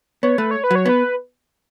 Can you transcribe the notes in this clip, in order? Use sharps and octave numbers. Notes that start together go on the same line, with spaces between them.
B3 C#5
A3 B4
C#5
B4
F#3 C#5
B3 B4